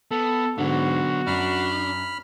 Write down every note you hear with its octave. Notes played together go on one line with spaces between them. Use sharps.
B3 A4
G#2 D3 F#3 B3 F#4
F#2 D4 B5 F6